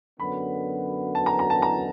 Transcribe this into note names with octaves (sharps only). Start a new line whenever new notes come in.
F#2 D3 F#3 B3 B5
A5
A#5
A#5
A5
A#5